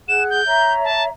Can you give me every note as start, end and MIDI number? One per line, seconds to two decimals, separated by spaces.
0.08 0.42 68
0.08 0.42 78
0.08 0.42 90
0.08 0.23 100
0.30 0.73 91
0.46 1.09 73
0.46 1.09 76
0.46 1.09 82
0.84 1.03 81